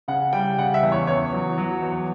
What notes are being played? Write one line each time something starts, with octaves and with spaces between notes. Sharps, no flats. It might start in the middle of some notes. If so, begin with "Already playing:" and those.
C#3 F#5
G3 G5
C#3 F#5
E5
E2
C#5
E2 C#5
F#3
F#3
E2